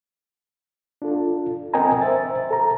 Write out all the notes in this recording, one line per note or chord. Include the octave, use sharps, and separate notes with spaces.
D4 F4 A4
C4 A#4 D#5 G5 G#5 A#5
C5 E5 A6
A4 A#5